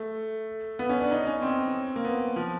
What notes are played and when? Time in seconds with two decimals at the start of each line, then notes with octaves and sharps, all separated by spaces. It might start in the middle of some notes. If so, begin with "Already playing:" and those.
Already playing: A3
0.79 B3
0.89 C#4
1.01 D4
1.11 D#4
1.27 C#4
1.42 C4
1.96 A#3
2.05 B3
2.36 F3